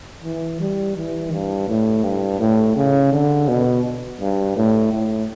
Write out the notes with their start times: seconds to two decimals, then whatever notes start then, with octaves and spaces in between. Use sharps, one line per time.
0.24 E3
0.60 G3
0.97 E3
1.32 G2
1.68 A2
2.04 G2
2.40 A2
2.76 C#3
3.13 D3
3.48 B2
4.21 G2
4.57 A2
4.93 A2